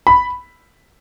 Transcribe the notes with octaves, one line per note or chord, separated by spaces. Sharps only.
B5